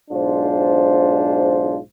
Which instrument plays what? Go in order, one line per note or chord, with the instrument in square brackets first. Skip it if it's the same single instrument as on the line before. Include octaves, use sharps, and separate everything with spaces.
[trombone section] B1 G#2 D4 F4 C5